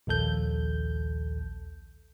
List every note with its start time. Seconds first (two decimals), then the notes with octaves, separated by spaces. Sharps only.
0.07 A#1 D#2 A4 G6